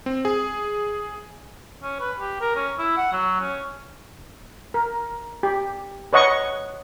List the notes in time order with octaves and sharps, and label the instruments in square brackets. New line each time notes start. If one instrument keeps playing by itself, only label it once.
[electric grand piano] C4
G#4
[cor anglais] C#4
B4
G4
A#4
C#4
E4
F#5
F#3
C#4
[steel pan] A#4
G4
B4 C#5 D#5 F#5 C#6